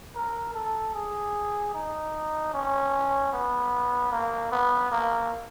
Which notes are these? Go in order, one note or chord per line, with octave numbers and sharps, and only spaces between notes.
A#4
A4
G#4
D#4
C#4
B3
A#3
B3
A#3